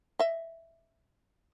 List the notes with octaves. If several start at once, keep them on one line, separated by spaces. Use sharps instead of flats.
D#5 E5